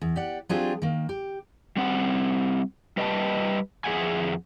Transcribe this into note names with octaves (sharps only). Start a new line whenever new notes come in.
E2
G4 D5 F#5
F#3 C4 D4 F4 G4 G#4
D#3 A#3
G4
G3 C4 F#5
G3 B4 D#5 E5 G5 A5
F2 G#4 E5 F#5 G#5